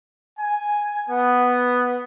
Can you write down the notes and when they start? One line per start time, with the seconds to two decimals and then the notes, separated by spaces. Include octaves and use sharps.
0.39 G#5
1.09 B3